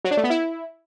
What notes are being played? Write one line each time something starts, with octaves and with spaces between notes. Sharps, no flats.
F#3
D4
A3
B3
E4